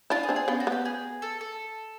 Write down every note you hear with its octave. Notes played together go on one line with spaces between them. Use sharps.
D4 E4 F4
G#4
C4 D4
G#4
B3 C#4 F4
F#4
B3 G4
G#4
A4
A4